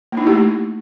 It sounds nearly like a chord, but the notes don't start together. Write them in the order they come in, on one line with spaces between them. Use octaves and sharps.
A#3 D#4 E4 G4 A3